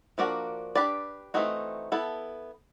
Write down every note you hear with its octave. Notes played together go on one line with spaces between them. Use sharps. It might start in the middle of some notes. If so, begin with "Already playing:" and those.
F3 A#3 D4 F#4 A#4
D4 G4 B4 D5
E3 A3 C4 D#4 F#4
B3 E4 A4